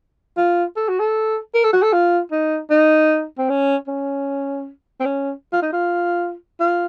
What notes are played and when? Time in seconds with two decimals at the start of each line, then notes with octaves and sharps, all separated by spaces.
0.37 F4
0.76 A4
0.89 F#4
1.00 A4
1.55 A#4
1.64 A4
1.73 F#4
1.83 A4
1.93 F4
2.31 D#4
2.70 D#4
3.38 C4
3.49 C#4
3.88 C#4
5.00 C4
5.05 C#4
5.53 F4
5.62 D#4
5.72 F4
6.60 F4